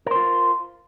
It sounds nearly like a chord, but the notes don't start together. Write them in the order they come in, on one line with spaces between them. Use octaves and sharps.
A#4 C5 F4